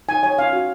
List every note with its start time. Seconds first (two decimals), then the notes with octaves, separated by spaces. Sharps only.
0.08 D#4 G#5
0.23 C#5 G#5
0.38 C#4 F5
0.53 F#4